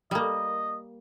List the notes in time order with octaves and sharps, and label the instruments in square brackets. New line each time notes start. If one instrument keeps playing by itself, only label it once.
[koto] G3 A#3 [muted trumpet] D#5